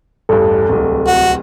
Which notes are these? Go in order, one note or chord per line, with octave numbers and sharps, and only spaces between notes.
A1 E2 G2 A4
D1 C2
F#4